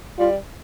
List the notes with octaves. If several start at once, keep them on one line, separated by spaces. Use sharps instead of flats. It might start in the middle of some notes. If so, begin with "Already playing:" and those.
G3 F4